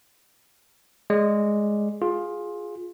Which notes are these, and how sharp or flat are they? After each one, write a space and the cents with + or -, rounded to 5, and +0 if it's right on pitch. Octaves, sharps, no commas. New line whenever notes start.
G#3 +0 D5 +0
F4 +15 G#4 +0